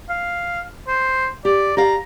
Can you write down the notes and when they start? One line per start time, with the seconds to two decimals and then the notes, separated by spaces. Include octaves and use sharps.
0.09 F5
0.87 C5
1.45 G4 D5
1.77 G4 D5 F5 A#5